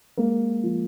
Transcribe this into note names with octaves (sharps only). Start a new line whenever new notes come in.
G#3 A#3 A#4
F3